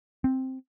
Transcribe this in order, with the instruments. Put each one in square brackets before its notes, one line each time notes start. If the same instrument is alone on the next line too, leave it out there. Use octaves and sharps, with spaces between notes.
[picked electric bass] C4